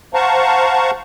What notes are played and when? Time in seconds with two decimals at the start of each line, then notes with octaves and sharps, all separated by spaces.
0.14 C5 F5 F#5 A5 A#5 C#6